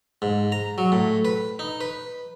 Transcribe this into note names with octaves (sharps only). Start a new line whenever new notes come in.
G#2
A#5
F#3
A2
B4
D#4
B4